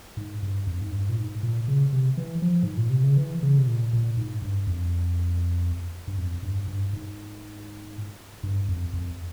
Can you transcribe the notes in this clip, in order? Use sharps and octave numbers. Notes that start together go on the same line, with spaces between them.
G#2
G2
F2
G#2
G2
A#2
G#2
A#2
C#3
C3
E3
F3
G#2
A#2
C3
C#3
E3
C#3
C3
A#2
A#2
G#2
G2
F2
G2
F2
G2
G2
G#2
G2
F2
F2